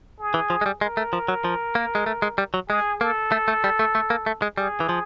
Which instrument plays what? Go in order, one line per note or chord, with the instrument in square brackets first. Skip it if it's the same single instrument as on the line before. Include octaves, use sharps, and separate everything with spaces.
[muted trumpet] G#4
[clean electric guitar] E3
F3
G#3
G3
[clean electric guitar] G#3 [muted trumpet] A#4
[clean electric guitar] A3
F3
F#3
F3
A#3
G#3
A3
G#3
G3
F#3
[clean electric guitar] G#3 [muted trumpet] G#4
[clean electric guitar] A#3 [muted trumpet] A4
[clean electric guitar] A3
A3
G3
A3
A3
A#3
A3
G#3
[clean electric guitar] G3 [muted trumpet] G#4
[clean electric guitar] E3
F3